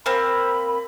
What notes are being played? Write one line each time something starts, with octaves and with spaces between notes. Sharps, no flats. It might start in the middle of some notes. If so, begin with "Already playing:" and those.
A#3 C4 A#4 B5